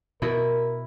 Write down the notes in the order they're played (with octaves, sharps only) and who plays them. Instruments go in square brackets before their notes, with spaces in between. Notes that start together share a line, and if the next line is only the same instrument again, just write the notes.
[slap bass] B2 [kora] E4 [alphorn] A#4